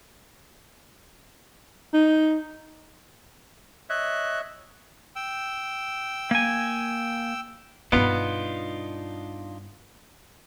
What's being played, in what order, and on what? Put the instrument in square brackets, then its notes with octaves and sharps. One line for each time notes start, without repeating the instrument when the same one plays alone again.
[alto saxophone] D#4
[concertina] C#5 D#5 E5 [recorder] F#6
[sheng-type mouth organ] G5 E6
[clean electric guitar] A#3 G#5
[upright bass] G2 B2 [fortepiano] B3 [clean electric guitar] D4 D#4 F4